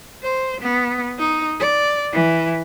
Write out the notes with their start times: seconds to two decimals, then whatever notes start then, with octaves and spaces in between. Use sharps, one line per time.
0.23 C5
0.61 B3
1.18 D#4
1.60 D5
2.13 E3